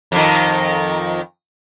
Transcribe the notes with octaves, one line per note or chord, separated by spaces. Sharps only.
F2 D#3